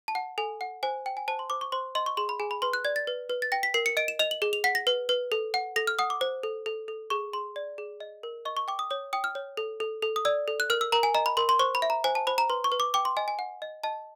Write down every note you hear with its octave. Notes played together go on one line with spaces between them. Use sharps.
A5
F#5
A4 G#5
F#5
C5 G#5
G5
G#5
C5 A5
C6
C5 D6
C#6
C5 C6
D#5 C6
C#6
G#4 C6
B5
G#4 G#5
B5
B4 C6
F#6
D5 G#6
A6
B4
B4
A6
G5 A#6
B6
A#4 C7
C#7
D#5 D7
E7
D#5 F7
F#7
G#4 G7
F7
F#5 B6
A#6
B4
B4
A4
F#5
A4 A#6
F6
F#5 D#6
D6
C5
A4
A4
A4
G#4 C#6
G#4 C6
D5
G#4
D#5
A#4
D#5 C#6
C#6
G5 D6
D#6
C#5 D#6
G5 D#6
F6
C#5
A4
A4
A4
D#6
D5 E6
A4
F#6
A#4 F6
E6
A#4 A#5
G#5
D#5 A#5
B5
A#4 C6
C6
C5 C#6
B5
E5
A#5
C5 G#5
A5
C5 B5
A#5
B4 C6
C#6
B4
D6
G5 D6
C6
D#5 G#5
G#5
F#5
D#5
D#5 A5